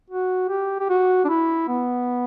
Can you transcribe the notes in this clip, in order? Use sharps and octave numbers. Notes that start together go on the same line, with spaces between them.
F#4
G4
G4
F#4
D4
E4
B3